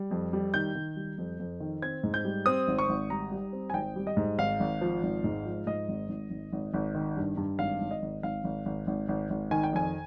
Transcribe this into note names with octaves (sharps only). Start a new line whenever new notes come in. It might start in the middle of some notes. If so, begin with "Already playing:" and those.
Already playing: G3
F2
G3
D#3 G6
D#3
G3
F2
F2
D#3
C4 G#6
G#2
G6
G3
C4 D#6
G#1
C#6
G#1
G3 A#5
G3
C4
G#5
G#1 G5
G3
D#5
G#2
G#1 F5
G#1
F3
G#1
G#2
F3
G#2 D#5
G#1
G#1
G#1
G#1
G#1
D#3
G2
G2
G#1 F5
G#1
D#5
G#1
G#1 F5
G#1
G#1
G#1
G#1
G#1
D#3 G#5
G5
F2 G#5